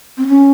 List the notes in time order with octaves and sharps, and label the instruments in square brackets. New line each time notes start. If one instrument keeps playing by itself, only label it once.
[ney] C4
C#4